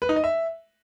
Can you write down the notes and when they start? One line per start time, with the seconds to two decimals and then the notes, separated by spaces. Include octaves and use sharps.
0.02 B4
0.09 D#4
0.16 D#5
0.24 E5